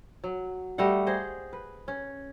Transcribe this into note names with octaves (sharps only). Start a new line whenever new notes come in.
F#3
G3 A3 D#5 F#5
G#4 C5 D#5
B4
C#4